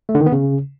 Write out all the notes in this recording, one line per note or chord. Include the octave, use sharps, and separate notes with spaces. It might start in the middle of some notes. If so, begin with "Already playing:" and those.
A3
D3
D#3
B3
C#3